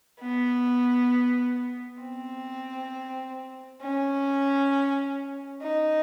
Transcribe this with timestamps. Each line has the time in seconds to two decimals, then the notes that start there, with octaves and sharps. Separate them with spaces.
0.21 B3
2.02 C4
3.82 C#4
5.62 D#4